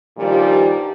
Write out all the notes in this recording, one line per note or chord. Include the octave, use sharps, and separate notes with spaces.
G2 A#2 D#3 F3 G3